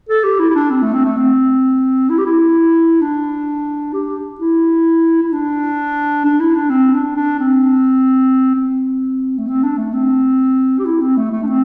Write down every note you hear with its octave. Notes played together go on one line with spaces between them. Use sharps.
A4
G4
E4
E4
D4
C4
A3
C4
A3
C4
E4
G4
E4
D4
G4
E4
E4
D4
D4
E4
D4
C4
D4
D4
C4
C4
A3
C4
D4
A3
C4
G4
E4
C4
A3
A3
D4
C4